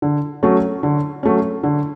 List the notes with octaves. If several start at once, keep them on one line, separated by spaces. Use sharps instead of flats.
D3
F#3 A3 C#4
D3
F#3 A3 C#4
D3